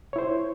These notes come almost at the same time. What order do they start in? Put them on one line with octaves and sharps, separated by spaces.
C#5 E4 C5